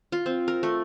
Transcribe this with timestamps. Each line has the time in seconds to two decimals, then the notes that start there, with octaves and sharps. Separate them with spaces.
0.12 F4
0.26 C4
0.48 A#4
0.63 A3